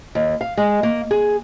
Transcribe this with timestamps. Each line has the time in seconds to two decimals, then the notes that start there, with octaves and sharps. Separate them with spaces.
0.15 D#2
0.41 F5
0.57 G#3
0.83 A#3
1.11 G#4